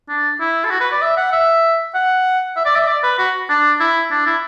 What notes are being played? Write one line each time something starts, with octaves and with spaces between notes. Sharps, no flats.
D4
E4
A4
F#4
B4
D5
E5
F#5
E5
F#5
E5
D5
E5
D5
B4
F#4
D4
E4
D4
E4